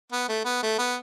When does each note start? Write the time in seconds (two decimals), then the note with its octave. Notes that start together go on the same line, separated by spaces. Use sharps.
0.13 B3
0.29 A3
0.45 B3
0.63 A3
0.79 B3